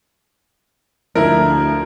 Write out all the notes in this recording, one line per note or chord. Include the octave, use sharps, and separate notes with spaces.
D2 F3 E4 A#4